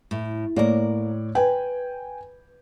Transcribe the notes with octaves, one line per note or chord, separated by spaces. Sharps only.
A2
A2 A#3 A#4 C#5 D5
B4 G5 G#5